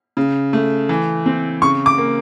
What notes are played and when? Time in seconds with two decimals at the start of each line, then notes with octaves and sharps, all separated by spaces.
0.17 C#3
0.53 A3
0.89 E3
1.26 C4
1.62 C#3 C#6
1.86 D6
1.98 A#3